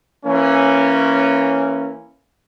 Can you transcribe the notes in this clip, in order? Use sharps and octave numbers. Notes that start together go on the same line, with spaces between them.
E3 A#3 C#4